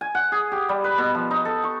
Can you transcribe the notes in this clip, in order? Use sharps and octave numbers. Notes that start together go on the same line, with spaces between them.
G#5
F#5
G#4
G4
G3
B4
B2
F3
D#4
A4
C#6